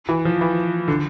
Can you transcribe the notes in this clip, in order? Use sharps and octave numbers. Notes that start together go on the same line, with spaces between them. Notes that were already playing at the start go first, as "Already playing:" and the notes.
E3
F3
E3
D3